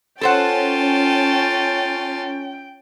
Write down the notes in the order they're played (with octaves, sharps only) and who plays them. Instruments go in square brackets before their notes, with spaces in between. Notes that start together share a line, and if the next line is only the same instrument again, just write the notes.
[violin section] C#4 [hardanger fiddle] F4 A5 [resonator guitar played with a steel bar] A4 C5 F#5 [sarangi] G5